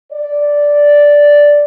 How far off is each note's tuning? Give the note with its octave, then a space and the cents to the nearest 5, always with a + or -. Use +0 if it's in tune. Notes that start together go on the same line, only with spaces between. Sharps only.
D5 -5